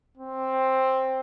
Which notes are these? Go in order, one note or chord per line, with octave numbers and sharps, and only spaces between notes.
C4